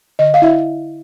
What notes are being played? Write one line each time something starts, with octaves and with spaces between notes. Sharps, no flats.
D3 D#5
F5
E4 E5